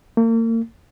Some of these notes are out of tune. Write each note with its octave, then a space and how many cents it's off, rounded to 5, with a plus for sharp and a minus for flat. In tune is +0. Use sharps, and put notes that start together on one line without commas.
A#3 -40